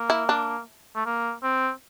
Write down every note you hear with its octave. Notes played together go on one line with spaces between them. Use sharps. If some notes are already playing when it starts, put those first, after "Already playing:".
Already playing: A#3
E4
D4
A3
A#3
C4